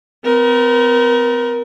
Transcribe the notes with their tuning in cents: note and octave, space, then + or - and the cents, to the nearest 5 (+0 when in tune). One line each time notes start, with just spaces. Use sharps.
C4 -40 A#4 +25